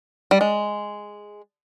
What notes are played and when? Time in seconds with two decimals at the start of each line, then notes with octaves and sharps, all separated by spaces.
0.31 G3
0.41 G#3